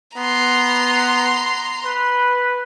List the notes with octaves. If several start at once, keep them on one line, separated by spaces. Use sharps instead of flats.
B3 A#5 C6
B4